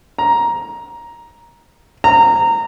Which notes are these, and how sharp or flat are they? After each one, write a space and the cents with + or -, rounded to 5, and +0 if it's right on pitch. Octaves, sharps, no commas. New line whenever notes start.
A#5 +10
A#5 -20